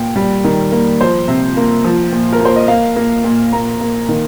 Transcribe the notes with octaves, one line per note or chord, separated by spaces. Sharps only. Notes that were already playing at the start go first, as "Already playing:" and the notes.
Already playing: A#2 G5
G3
D#3
A#3
F3 C5
C3
A#3
F3
A#2
A#4
A#3 C5
D#5
A#3 F5
A#3
A#2
A#3 A#5
A#3
D#3